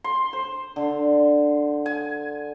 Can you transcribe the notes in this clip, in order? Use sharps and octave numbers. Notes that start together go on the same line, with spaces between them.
C6
C5
D3
G#5